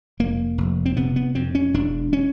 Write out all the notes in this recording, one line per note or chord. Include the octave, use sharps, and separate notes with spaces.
F1 A#3
F1
C4
C3 B3
B3
F2 C4
C#4
E1 D4
C#4